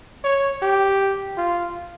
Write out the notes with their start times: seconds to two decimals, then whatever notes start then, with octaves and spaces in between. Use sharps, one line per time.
0.24 C#5
0.62 G4
1.37 F4